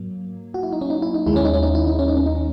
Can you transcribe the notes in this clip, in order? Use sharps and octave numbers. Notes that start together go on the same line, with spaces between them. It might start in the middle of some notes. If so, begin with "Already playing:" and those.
Already playing: G#2 F#3 A#3
F#4
E4
D#4
C#4
D#4
E4
D#4
D#2 D#3 G#3 E4
C#4
D#4
C#4
D#4
E4
D#4
C#4
D#4
C#4
D#4
C#4